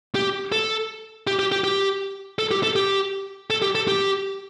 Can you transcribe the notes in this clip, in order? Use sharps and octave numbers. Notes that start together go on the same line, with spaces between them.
G4
A4
G4
G4
G4
G4
A4
G4
A4
G4
A4
G4
A4
G4